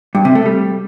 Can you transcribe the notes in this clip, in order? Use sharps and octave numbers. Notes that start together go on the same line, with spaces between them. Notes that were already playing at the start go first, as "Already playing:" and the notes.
G2
C3
A3
G3